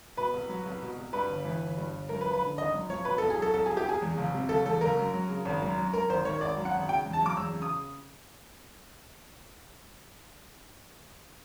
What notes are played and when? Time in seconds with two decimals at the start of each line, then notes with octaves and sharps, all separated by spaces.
0.17 B2 B4
0.33 C2
0.49 F#3
0.66 C2
0.82 B2
0.98 C2
1.13 G2 B4
1.29 G1
1.45 E3
1.61 G1
1.77 G2
1.93 G1
2.09 F#2 A#4
2.21 B4
2.26 F3
2.33 B4
2.42 D3
2.57 G#1 D#5
2.74 F#2
2.89 F3 C#5
3.05 B2 B4
3.18 A4
3.22 C2
3.30 G#4
3.38 F#3 A4
3.53 C2 A4
3.66 B2 G#4
3.77 G4
3.86 C2 G#4
4.02 E2
4.17 F#1
4.34 C3
4.49 F#1 A4
4.66 E2 A4
4.81 F#1 A#4
4.98 F#2
5.14 F#3
5.29 C#3
5.45 G#1
5.62 F#2
5.78 F#3
5.93 F#2 A#4
6.09 G#1 C5
6.25 D#3 C#5
6.41 G#1 D5
6.57 F#2
6.65 F#5
6.74 G#1
6.89 C#3 G5
7.06 E2
7.13 A5
7.22 F#3 D6
7.37 E2 E6
7.54 C#3
7.62 D#6